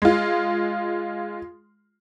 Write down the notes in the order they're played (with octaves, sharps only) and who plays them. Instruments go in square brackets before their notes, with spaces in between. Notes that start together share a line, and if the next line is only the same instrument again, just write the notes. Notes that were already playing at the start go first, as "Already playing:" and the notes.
[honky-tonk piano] G#3 F4